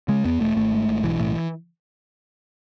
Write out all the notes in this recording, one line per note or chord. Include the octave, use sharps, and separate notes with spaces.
C#3 G#3
E2 B3
E1 A3
G#1 A3
G#2
G#1
B1 E3
A2